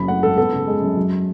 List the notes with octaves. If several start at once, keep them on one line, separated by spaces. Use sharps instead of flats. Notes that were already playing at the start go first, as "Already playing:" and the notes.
Already playing: F#1 F#3 C#4 B5
A3 F#5
G#2 A4
B3 A4
C#3
G#3
F#2
F#3